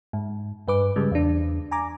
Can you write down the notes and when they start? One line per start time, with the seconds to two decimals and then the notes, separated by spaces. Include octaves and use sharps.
0.13 G#2
0.68 G2 B4 D6
0.96 C#3 G3 G#3
1.11 E2 D4
1.71 G#5 A#5 D6